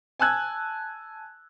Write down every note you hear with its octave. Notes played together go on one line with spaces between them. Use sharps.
G#5 A5 E6 F#6 G#6